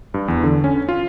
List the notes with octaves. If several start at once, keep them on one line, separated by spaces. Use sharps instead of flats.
G2
E2
D3
C#4
F4